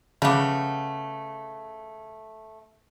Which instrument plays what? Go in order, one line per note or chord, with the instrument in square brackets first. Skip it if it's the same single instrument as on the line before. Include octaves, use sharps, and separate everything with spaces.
[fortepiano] C#3 D6 [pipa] A3 B3